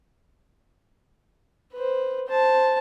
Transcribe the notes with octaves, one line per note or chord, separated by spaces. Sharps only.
B4 C5
C5 A5